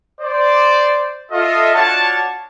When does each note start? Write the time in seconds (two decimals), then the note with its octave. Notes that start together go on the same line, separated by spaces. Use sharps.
0.21 C5 D5
1.31 F4 A4 D#5 E5
1.75 D4 F4 F#4 C#5 F#5 A5